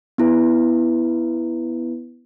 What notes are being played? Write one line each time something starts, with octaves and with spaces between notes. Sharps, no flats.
B3 E4 B4